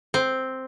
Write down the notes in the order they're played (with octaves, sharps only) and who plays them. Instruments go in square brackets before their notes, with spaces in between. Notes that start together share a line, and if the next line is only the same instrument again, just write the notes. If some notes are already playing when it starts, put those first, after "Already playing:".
[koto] C4